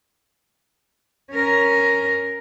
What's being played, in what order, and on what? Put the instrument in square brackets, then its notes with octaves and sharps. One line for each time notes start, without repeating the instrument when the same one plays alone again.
[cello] C#4 A#4